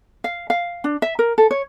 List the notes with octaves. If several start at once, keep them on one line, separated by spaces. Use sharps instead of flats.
F5
F5
D4
E5
A#4
A4
C#5